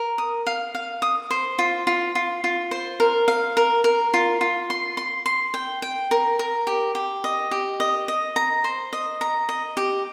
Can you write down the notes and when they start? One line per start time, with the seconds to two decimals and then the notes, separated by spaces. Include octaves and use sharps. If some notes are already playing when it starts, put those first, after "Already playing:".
Already playing: A#4
0.18 D#6
0.47 F5
0.75 F5
1.02 D#6
1.30 C5
1.59 F4
1.87 F4
2.15 F4
2.44 F4
2.71 C5
3.00 A#4
3.28 F5
3.57 A#4
3.84 A#4
4.14 F4
4.41 F4
4.70 C6
4.97 C6
5.26 C6
5.54 G5
5.82 G5
6.11 A#4
6.39 A#4
6.67 G4
6.95 G4
7.24 D#5
7.51 G4
7.80 D#5
8.08 D#5
8.36 A#5
8.64 C5
8.93 D#5
9.21 A#5
9.49 D#5
9.77 G4